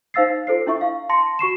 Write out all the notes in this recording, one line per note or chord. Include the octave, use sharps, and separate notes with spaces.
D#4 C5 F5 E6 A6 C7
F4 A4 C5 C7
D4 E4 E5 C#6
F5
A5 C6 A#6 C#7
F#4 C#6 C7 E7